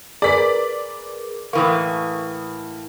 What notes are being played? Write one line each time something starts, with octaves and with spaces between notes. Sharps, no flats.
G#4 A#4 B4 D5 B6
A2 E3 A#3 C#6 D#6